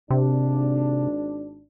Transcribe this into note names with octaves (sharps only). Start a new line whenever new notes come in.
G#1 C3 D4